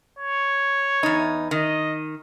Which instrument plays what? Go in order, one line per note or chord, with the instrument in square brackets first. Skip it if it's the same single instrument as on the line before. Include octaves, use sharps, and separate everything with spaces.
[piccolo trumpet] C#5
[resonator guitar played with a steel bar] E2 D#4
[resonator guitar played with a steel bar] D#3 [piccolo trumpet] D#5